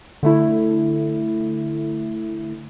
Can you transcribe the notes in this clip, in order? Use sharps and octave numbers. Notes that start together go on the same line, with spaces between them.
D3 A3 E4